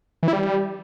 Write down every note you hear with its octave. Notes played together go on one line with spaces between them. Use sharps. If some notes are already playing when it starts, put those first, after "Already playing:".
E3
E4
G3